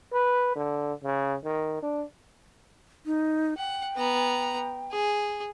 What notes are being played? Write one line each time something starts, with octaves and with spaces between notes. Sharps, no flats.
B4
D3
C#3
D#3
D4
D#4
F#5 G5
B3 A#5
G#4